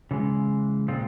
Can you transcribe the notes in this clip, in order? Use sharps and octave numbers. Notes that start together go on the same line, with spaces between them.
C#3 E3 G#3
A#2 G#3 C4 F4